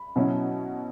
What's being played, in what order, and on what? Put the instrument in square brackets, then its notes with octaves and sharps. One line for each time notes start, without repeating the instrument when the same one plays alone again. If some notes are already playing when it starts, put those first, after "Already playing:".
Already playing: [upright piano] B5
B2 F#3 C#4 E4